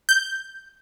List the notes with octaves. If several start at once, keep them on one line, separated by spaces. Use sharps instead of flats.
G6